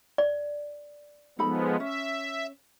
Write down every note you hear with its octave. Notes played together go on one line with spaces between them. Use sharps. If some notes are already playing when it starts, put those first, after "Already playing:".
D5
F3 G#3 B3 D#4 A4 B5
C#4 E5